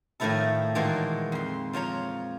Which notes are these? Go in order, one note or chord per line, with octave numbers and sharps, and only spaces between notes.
A2 D#3 F3 A3 E4 A4
A#2 D#3 E3 G#3 A#3 F#4
F2 C6
F3 F4 C#5 A#5